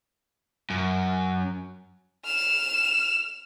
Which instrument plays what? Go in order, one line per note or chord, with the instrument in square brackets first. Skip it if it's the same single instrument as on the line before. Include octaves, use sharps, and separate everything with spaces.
[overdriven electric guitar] F#2
[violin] F6 E7